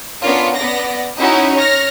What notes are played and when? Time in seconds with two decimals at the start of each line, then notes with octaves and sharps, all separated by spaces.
0.23 B3 C#4 D4 F4 A#4
0.55 B3 D5 A#6
1.17 C#4 D#4 E4 F#4
1.55 C#5 F6 A#6